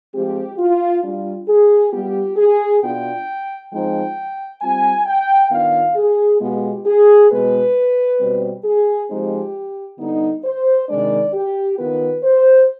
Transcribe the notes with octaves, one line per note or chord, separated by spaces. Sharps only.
F3 G#3 C4 G4
F4
G3 D4 F4
G#4
G3 B3 F4 G4
G#4
B2 B3 D4 F4 G5
F3 G#3 C4 D#4 G5
G3 C4 F4 G#5
G5
D#3 B3 D4 F4 F5
G#4
B2 G#3 B3 F4 G4
G#4
B2 G#3 B3 B4
B2 G3 C4
G#4
F3 G#3 C4 D#4 G4
D3 G3 B3 D#4
C5
C3 D#3 G#3 D4 D5
G4
D#3 B3 F4 B4
C5